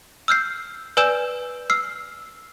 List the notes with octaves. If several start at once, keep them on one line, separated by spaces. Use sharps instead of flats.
E6 F6 G6 C7
B4 D5 G#5 E6 G6 E7
E6 F6 C7